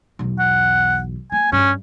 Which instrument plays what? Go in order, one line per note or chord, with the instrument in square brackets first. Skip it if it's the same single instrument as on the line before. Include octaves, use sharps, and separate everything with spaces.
[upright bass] B1 E2
[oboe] F#5
[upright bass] A#3 [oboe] G#5
[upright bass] G2 [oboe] C#4